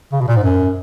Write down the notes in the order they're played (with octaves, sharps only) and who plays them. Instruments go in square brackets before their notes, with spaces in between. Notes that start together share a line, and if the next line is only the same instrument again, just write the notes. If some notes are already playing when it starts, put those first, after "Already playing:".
[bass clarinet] C#3
B2
A#2
G#2
F#2